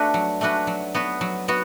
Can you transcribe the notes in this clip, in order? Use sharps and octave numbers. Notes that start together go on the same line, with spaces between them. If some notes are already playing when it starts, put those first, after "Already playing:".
Already playing: A3 D4 F#4 B4
F#3
A3 D4 F#4 B4
F#3
B3 F#4 B4
F#3
B3 F#4